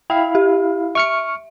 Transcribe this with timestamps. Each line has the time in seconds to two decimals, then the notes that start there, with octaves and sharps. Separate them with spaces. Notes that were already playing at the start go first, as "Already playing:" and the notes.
0.10 E4 F5 G5
0.35 G4
0.95 E5 C#6 F6 C#7